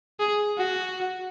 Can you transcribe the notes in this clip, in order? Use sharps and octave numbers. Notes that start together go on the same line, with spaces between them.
G#4
F#4